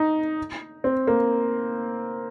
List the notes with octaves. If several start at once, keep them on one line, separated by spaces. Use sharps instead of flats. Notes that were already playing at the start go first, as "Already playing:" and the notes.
Already playing: D#4
C4
A#3